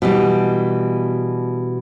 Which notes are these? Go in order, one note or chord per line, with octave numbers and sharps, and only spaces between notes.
B2 E3 G3